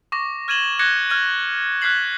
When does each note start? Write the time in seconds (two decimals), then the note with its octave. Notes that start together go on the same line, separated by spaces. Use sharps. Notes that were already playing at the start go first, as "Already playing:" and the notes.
0.12 C#6 D6 A#6
0.48 F6 G#6 D#7 E7 F#7 G7
0.79 D6 F#6 G#6 A#6 C#7 G7
1.10 F6 G#6 D#7
1.81 F6 F#6 G#6 B6 C7 F#7